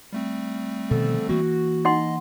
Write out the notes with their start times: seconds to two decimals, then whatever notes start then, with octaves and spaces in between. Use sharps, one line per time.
0.13 G3 A3 C4
0.91 B2 D3 D#3 F3 A4
1.29 E3 A#3 F#4
1.85 D#4 D#5 F#5 C6